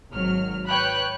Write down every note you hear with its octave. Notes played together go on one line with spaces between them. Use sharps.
G#1 F#3 F6
B4 C#5 G5 B5 F#6